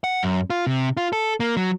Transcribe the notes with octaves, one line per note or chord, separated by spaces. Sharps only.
F#5
F#2
F4
C3
F4
A4
A#3
F#3